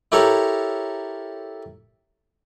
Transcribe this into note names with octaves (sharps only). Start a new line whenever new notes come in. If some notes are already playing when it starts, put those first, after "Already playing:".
E4 G4 A4 A#4 C#5